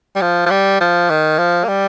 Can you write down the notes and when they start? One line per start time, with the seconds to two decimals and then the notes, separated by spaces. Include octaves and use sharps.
0.16 G3
0.22 F3
0.46 F3
0.51 G3
0.81 F3
1.10 D#3
1.39 F3
1.64 A#3
1.69 G3